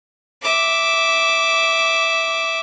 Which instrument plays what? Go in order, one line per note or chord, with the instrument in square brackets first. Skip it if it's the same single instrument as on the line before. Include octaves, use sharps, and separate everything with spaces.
[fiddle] E5 D6